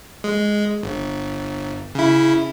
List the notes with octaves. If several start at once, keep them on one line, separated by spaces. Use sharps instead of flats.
G#3
G1
C#3 E4